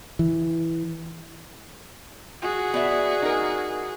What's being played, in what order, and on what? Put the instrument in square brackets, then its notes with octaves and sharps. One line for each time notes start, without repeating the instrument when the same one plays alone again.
[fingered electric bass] E3
[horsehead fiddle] F#4 G#4
[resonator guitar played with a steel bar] B3 D5 E5
D#4 A#4